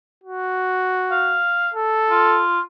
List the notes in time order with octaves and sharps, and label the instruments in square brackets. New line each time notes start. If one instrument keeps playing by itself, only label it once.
[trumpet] F#4
[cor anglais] F5
[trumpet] A4
[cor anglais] F4